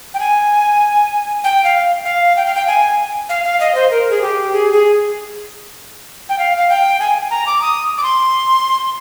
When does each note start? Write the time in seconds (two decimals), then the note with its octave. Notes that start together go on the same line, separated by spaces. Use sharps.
0.14 G5
0.20 G#5
1.44 G5
1.64 F5
2.05 F5
2.36 G5
2.46 F5
2.55 G5
2.67 G#5
3.29 F5
3.44 F5
3.60 D#5
3.75 C5
3.91 A#4
4.11 G#4
4.22 G4
4.53 G#4
4.73 G#4
6.29 G5
6.38 F5
6.57 F5
6.69 G5
7.00 G#5
7.31 A#5
7.47 D6
7.61 D#6
7.98 D6
8.03 C6